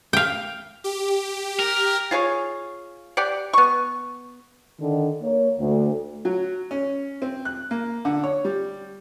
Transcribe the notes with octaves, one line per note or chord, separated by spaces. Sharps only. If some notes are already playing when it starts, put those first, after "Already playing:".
F5 G5
G4
A#4
F4 G#4 C#5 F5
G4 D5 F#5
B3 C#6
D3 D#3
A#3 A#4 C#5
D2
F#3
C#4
C4
F#6
A#3
D3
C#5
G3